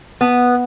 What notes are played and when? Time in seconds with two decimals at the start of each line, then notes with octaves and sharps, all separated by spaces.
0.21 B3